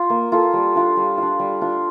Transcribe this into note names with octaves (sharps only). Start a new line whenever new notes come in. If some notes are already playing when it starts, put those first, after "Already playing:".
Already playing: F4
A#3
F4 A4
G3
D4 F4
G3
D4 F4
G3
D4 F4